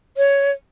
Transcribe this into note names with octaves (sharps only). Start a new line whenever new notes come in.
C#5